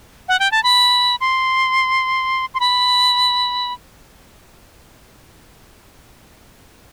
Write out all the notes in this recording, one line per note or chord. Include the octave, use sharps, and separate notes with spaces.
F#5
G5
A5
B5
C6
C6
B5